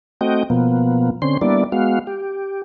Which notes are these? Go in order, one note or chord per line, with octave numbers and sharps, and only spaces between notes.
A3 C4 F#4 D#5 G5
B2 F3 A#3 B3
D3 C4 C#4 C6
G3 A#3 B3 D4 E4 D5
G#3 B3 F#4 F5
G4